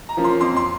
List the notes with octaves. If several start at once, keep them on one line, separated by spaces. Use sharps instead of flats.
A#5
F3 A#3 C#4
C6
F2 C6
C6